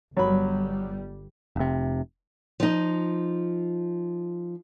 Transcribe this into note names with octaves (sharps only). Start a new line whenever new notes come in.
G1 F#3 G3 B5
F1 C3
F3 D#4